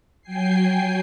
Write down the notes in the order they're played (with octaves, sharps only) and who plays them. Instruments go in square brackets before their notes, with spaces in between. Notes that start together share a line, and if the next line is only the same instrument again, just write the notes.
[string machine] F#3 G5 G#5 C7